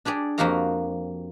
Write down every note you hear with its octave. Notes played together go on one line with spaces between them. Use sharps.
D4 G4 G#4 D5
F2 A#3 F#4 G4 F5 A#5